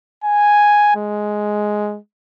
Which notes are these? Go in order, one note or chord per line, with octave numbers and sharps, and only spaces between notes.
G#5
G#3